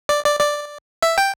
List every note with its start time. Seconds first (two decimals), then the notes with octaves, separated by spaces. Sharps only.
0.09 D5
0.25 D5
0.40 D5
1.02 E5
1.18 G5